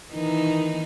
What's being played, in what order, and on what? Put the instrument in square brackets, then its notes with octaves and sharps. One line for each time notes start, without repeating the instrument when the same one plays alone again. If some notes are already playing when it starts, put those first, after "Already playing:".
[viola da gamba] D#3 E3 D#4